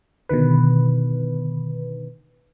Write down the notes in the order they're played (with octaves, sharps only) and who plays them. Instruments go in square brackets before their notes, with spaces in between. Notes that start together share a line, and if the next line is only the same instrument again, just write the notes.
[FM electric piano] B2 D3 D#3 B4